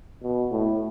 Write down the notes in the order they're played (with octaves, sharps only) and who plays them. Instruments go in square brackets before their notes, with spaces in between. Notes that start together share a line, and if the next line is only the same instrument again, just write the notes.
[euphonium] B2
A2